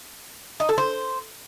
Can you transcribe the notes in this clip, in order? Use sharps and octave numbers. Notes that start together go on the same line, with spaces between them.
D#4
A4
C5